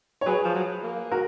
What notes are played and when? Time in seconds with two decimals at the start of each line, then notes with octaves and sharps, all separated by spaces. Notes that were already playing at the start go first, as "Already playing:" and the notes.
0.21 C#5
0.26 F#3 G#4 B4
0.45 F3
0.55 F#3
0.83 A#3
1.11 F#4 A#4